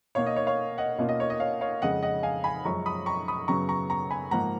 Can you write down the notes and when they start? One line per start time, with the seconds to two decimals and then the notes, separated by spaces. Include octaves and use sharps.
0.15 B2 A#3 D#4 C#5 F5
0.27 D#5
0.36 C#5
0.47 C#5 F5
0.78 D#5 F#5
0.98 B2 A#3 C#4 F4
1.09 D#5
1.20 C#5
1.30 D#5
1.40 C#5 F5
1.61 C#5 F5
1.82 F2 C#3 G#3 D#5 F#5
2.03 D#5 F#5
2.23 F5 G#5
2.44 G#5 B5
2.65 F#2 F3 G#3 C#4 A#5 C#6
2.86 B5 D#6
3.06 A#5 C#6
3.28 B5 D#6
3.48 F#2 C#3 F#3 B3 A#5 C#6
3.69 A#5 C#6
3.90 A#5 C#6
4.11 G#5 B5
4.31 G#2 F3 A#3 F#5 A#5